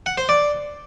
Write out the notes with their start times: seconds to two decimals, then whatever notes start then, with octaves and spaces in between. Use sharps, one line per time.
0.06 F#5
0.18 C5
0.29 D5